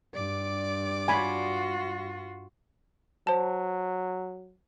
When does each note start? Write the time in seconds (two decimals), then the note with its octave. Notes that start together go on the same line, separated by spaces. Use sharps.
0.14 G2 D5 D6
1.08 F4 F#4 G#5 B5
3.27 F#3 C5 A5